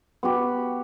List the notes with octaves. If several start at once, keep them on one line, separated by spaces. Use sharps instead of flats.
B3 F#4 G4